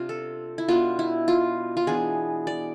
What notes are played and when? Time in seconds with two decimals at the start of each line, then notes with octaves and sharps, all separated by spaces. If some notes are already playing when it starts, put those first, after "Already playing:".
Already playing: C3 D4 F4
0.09 A4
0.58 E4
0.68 B2 B3 D4 F4
0.99 E4
1.28 F4
1.77 F4
1.87 E3 B3 D4 G#4
2.47 D5